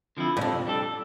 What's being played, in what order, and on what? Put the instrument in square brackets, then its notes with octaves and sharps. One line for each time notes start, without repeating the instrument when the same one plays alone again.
[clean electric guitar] D3 F3 C4 E4
[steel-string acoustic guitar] G2
[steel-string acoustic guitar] F2 [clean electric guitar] C3
[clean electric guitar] G3 D4 A4